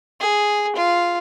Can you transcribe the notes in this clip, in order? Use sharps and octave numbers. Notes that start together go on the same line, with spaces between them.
G#4
F4